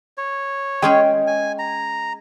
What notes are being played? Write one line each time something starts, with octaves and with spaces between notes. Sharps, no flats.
C#5
G#3 C#4 G#4 G5
G#5
A#5